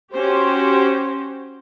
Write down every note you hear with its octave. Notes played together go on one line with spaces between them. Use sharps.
C#4 F#4 G4 C5